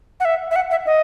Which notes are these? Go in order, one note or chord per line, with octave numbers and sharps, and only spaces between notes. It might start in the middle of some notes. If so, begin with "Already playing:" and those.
F#5
E5
E5
F#5
E5
D#5